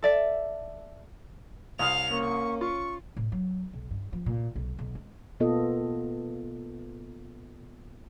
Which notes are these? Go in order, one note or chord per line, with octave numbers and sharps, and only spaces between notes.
A4 D5 E5
C2 F5 D#6 F6 F7
A#3 C#4 C#6
F4 C#6
A2
F#3
B1
G2
F3
A#2
B1
B1
G#3
B2 A#3 B3 F4 A4 D#5